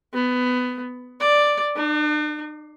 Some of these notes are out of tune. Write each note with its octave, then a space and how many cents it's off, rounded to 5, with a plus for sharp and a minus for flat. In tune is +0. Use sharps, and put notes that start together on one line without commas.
B3 +20
D5 +0
D4 +45